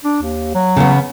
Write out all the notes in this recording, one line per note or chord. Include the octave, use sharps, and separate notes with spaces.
D4
D#2
F#3
C#3 B3